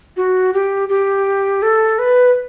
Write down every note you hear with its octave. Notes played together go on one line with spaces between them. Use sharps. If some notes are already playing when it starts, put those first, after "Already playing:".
F#4
G4
G4
A4
B4